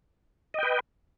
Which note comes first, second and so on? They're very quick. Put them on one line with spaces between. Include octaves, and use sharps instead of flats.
D#5 G5 B4